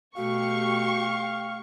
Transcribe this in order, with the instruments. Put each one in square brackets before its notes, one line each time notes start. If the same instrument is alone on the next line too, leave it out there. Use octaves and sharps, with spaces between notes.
[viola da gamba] B2 A3 [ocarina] F#4 [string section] G4 C#6 [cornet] F5